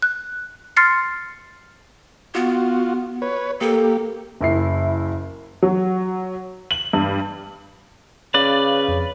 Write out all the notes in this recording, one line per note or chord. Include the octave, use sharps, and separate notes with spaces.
F#6
C6 F6 A6 C7 C#7
B3 F4 F#4
B4 C#5
A#3 G4 A4
F#1 E4 C7
F#3
F#7
G2
C#3 C#4 B4 D5 F5
F2